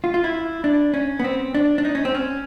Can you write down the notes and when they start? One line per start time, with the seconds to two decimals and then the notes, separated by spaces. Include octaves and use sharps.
0.04 F4
0.14 F4
0.24 E4
0.64 D4
0.94 C#4
1.20 B3
1.24 C4
1.54 D4
1.78 D4
1.85 D#4
1.95 C#4
2.05 C4
2.15 C#4